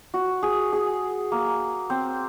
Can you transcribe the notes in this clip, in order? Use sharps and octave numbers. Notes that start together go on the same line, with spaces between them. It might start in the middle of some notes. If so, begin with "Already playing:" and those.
F#4
G#4
G#4
A#3
C4